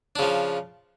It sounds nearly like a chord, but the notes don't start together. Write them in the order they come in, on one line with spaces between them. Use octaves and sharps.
D4 C#3 F3